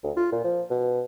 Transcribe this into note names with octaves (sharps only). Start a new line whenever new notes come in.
D2
F4
A#2
F3
B2